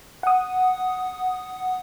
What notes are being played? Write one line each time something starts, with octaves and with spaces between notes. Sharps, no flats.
F#5 D#6